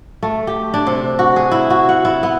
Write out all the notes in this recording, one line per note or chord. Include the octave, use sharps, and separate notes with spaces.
A3
G4
D4
C3
F#4
G#4
E4
F#4
F#5
E4
B3